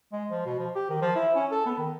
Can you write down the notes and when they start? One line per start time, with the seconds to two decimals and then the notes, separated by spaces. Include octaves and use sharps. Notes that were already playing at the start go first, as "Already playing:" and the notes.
0.12 G#3
0.30 F3
0.46 B2
0.59 F3
0.75 G4
0.90 D#3
1.01 F3
1.15 E4
1.35 C#4
1.51 A4
1.66 B3
1.78 D#3